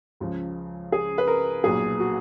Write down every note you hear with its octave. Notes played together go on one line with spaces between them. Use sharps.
C#2 C#3 F3
G#4
B4
A#4
B1 A#2 F#3 G#4
F#4